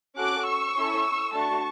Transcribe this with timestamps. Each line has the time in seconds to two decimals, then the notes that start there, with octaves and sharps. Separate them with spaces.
0.17 C#4 F#4 A4 D6 F#6
0.46 C#6 E6
0.76 C#4 E4 A4
1.34 A3 D4 F#4 A5 C#6